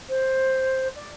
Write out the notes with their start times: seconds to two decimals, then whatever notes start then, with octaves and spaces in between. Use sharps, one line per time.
0.08 C5
0.95 D5